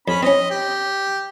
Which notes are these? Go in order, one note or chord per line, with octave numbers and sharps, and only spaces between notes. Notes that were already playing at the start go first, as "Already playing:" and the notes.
F2 C#4 B5
C4 C#4 D#5
G4